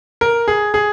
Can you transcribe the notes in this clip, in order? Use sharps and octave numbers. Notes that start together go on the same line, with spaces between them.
A#4
G#4
G#4